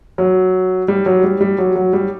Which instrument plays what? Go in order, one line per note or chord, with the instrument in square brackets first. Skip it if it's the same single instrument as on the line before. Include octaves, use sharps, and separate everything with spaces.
[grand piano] F#3
G3
F#3
G3
G3
F#3
F#3
G3